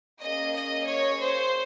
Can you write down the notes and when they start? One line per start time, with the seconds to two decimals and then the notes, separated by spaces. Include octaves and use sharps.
0.21 A#3 C#4 G#4 D#5
0.54 D#5
0.87 C#5
1.20 C5